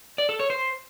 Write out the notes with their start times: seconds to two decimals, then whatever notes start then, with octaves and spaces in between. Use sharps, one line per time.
0.18 D5
0.29 A4
0.39 C#5
0.50 C5